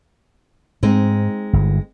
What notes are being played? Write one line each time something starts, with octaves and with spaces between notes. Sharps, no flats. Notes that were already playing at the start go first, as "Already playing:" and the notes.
G#2 G#3 C4 D#4
G1